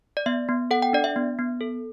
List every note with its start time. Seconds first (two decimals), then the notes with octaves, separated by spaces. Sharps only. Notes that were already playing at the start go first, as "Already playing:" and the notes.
0.17 D5
0.26 B3 E5
0.49 B3
0.71 A4 F#5
0.82 G5
0.93 D4 D5
1.04 E5
1.16 B3
1.39 B3
1.61 A4